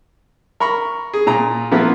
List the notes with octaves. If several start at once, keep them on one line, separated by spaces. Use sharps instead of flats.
A#4 B5 C#6
G#4
A#2 A#5
F3 A#3 B3 E4 A#4 B4